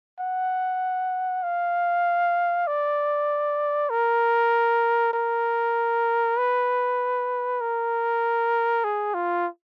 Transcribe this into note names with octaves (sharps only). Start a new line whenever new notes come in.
F#5
F5
D5
A#4
A#4
B4
A#4
G#4
F4